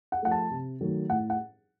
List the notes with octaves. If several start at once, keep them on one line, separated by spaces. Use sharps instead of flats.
F#5
F3 A3 F#5
A5
C3
D#3 F#3 A3
A2 F#5
F#5